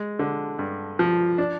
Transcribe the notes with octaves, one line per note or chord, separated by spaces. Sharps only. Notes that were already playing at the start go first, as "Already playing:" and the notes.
Already playing: G#3
D3
G2
F3
D4